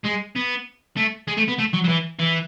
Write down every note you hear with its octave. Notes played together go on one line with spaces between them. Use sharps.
G#3
B3
A3
G#3
A3
B3
A3
F#3
F#3
E3
E3